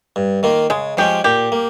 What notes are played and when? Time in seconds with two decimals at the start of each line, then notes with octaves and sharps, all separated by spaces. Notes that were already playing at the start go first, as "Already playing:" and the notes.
0.16 G2
0.43 D#3 A#3 F4
0.70 C#3 G#3
0.97 F3 G#3 C#4 G4
1.24 A#2 G4
1.52 A#3